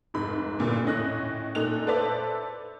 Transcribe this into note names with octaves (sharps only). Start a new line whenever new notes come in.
F1 G#2 B5
E2 G2 A#2 D3
A2 C#4 D#5 F#6
A#2 A3 D#4 F#6 F7
A4 B4 C5 D5 E5 A5